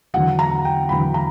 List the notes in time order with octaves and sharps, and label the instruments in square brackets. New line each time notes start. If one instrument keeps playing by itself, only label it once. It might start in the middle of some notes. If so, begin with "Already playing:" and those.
[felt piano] E2 D3 F#3 F#5
A#5
G5
E2 D3 F#3 B5
A#5